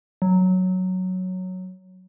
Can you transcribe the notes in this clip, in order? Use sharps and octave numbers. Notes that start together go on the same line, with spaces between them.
F#3